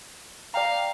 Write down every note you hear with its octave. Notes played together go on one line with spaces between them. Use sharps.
D5 F5 G5 A#5